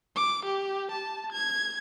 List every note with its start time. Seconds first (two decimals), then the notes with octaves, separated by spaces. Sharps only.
0.16 D6
0.46 G4
0.92 A5
1.33 G#6